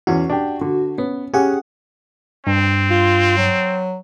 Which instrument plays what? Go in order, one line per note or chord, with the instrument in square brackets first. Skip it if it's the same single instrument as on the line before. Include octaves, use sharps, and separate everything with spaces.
[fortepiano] E2 C#4 [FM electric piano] F#4
[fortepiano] D4 G4
D3
[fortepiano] B3 [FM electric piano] C#4
[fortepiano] C#4 [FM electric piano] G4 G#4 F#5
[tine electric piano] G2 [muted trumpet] C4
[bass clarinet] F4
F#3